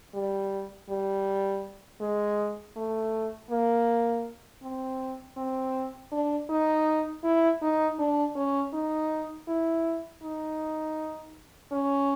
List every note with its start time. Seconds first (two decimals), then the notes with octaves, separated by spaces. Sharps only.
0.14 G3
0.89 G3
2.01 G#3
2.76 A3
3.50 A#3
4.63 C4
5.37 C4
6.12 D4
6.49 D#4
7.24 E4
7.61 D#4
7.99 D4
8.36 C#4
8.73 D#4
9.48 E4
10.22 D#4
11.71 C#4